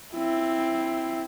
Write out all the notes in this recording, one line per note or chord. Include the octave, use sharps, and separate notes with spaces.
C4 E4